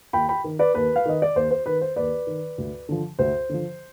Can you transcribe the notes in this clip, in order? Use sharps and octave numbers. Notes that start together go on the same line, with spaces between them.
D#2 G5 B5
G5 B5
D#3
B4 D5
D#2 B4
F5
D#3 D#5
D5
D#2 C5
C5
D#3 B4
C5
D#2 B4 D5
D#3
D2
D3 F3
D2 C5
D3 F3